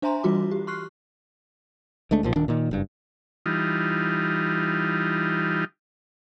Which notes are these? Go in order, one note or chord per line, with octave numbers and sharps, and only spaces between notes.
D4 C5 E5 G#5 A#5 C6
E3 G3 F4 F#4 D6
G4
C6 C#6 F6 F#6 C7
D2 G#3 A3 D4
B1 A#2 F3
D#1 D#3 D4
A#2 D#3
F#1 G2
E3 G3 D#4 F4